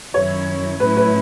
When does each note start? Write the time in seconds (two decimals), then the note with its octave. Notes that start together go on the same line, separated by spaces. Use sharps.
0.14 F#2 D#3 F#3 C#4 E4 C#5
0.80 A2 F#3 A3 C#4 E4 B4
0.97 B4